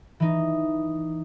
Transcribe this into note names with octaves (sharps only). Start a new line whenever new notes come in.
E3 D#4